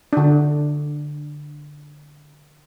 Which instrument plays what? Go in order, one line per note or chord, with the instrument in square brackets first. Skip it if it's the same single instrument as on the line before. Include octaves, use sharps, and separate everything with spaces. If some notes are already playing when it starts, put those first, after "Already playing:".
[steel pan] D3 D4